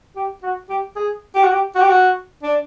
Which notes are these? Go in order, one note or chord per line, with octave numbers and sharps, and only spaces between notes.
G4
F#4
G4
G#4
G4
F#4
G4
F#4
G4
F#4
D4